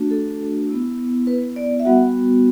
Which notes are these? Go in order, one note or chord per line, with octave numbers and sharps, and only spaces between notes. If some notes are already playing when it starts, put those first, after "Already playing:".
Already playing: A3 D4 F#4
A4
B3 E4
B4
D5
E5
G3 B3 F#4 F#5